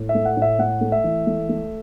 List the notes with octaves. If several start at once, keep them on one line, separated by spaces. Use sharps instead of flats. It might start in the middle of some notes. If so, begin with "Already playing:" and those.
Already playing: A2
E5
A3
F#5
A2 E5
A3 F#5
A3
E5
E3
A3
A3